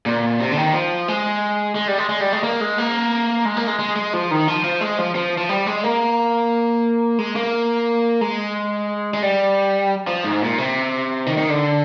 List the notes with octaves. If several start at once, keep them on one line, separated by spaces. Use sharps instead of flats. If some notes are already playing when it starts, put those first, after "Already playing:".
A#2
C3
D3
D#3
F3
G#3
G#3
G3
G#3
G#3
G3
G#3
A#3
G#3
A#3
G#3
A#3
G#3
G#3
G#3
F3
D#3
F3
F3
G#3
F3
F3
F3
G3
G#3
A#3
G#3
A#3
G#3
G#3
G3
F3
G#2
A#2
C3
D#3
D#3
D3